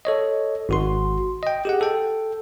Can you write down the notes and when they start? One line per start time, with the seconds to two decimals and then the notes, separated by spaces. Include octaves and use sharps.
0.05 A4 C#5 D#5
0.69 G#1 F#4 C6
1.43 D#5 G5
1.65 G4 G#4 F#5
1.81 A4 G5